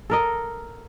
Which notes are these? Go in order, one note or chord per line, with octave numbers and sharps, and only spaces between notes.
A4 A#4 D#5